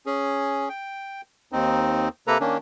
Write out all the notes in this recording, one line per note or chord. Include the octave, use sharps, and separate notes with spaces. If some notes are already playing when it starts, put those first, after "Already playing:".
C#4 G#4
G5
D#2 C4 D#4
C3 A#3 A4 B4 A#5
D#3 A#3 C#4 D4